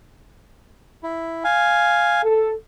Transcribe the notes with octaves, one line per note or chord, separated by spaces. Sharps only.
E4
F5 G#5
A4